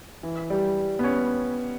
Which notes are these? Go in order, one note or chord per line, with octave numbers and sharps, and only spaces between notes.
E3
G3
B3
C#4